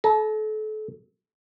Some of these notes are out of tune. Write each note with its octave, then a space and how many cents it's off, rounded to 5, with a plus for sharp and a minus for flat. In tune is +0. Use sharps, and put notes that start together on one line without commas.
A4 -35 A#5 +10